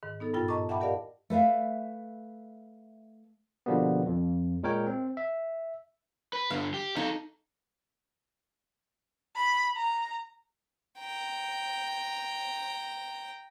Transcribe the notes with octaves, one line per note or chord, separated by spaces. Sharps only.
G#2 D#3
B3 D#4 A4
G2 A#2 E4 F4 G5 A6
D#5 A5 A#5 C#6 D6
E5 F#5 G5 A5 B5 D6
G4 A#4 D5 D#5 F5 F#5
A3 B4 E5 F5
B2 D3 F3 G3 A#3 B3
F2
A#2 G#3 A#4 C#5 G5
C4
E5
B4
G2 D3 F5
G4
D#4 A4 F5
B5
A#5
G5 A#5